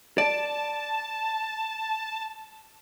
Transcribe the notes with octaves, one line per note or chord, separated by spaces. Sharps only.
D5 A5